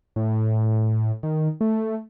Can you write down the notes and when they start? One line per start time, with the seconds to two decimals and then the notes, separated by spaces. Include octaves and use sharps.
0.16 A2
1.23 D#3
1.61 A3